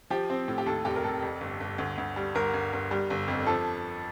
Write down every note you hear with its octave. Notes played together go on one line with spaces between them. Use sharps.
F3 G4
C4
A2
G4
D#2 A4
F1 G4
A#4
F1 A4
F2
G1
G1
D2
D2
G3
G1 A#4
G1
G1
G3
G1
F2
F3 A4